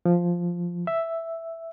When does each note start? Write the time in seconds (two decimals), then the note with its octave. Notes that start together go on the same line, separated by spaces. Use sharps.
0.06 F3
0.87 E5